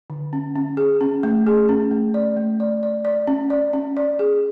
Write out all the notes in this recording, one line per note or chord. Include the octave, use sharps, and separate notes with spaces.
D3
C#4
C#4
G#4
C#4
A3
G#4
C#4
A3
D5
A3
D5
D5
D5
C#4
D5
C#4
D5
G#4